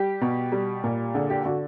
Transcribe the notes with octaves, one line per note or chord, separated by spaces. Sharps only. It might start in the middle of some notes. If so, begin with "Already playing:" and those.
Already playing: G3 G4
B2
G3
A#2
D3 G#4
G4
D3 F#4